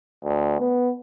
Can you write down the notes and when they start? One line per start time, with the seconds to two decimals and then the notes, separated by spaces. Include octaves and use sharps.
0.24 D2
0.60 B3